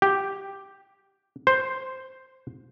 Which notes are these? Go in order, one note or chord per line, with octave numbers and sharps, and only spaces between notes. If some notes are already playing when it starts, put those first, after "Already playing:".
G4
C5